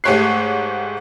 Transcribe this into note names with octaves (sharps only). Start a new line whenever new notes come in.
G#2 A3 G4 C#5 F#6 C7